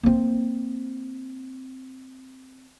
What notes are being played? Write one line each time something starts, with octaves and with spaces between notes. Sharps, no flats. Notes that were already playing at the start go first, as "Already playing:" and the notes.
A#3 C4